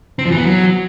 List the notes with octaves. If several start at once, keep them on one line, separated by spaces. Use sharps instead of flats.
C4
F3
E3
B3
F#3